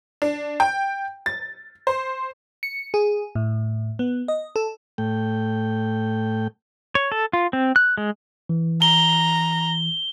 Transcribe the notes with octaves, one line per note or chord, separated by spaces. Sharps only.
D4
G5
A6
C5
C#7
G#4
A2
B3
D#5
A4
A2 A3 G5
C#5
A4
F4
C4
F#6
G#3
E3
A#5 G7